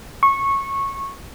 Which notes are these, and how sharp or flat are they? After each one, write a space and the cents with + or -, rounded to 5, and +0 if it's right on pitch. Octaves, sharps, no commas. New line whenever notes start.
C#6 -15